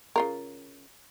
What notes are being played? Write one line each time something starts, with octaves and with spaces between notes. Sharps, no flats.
C#3 F4 A#4